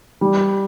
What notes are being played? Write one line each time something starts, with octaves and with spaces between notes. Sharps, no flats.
G3